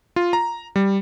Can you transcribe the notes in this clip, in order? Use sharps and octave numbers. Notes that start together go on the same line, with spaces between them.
F4
A#5
G3